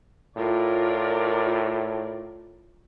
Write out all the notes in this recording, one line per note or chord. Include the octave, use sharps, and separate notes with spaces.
A2 F4 A#4 D5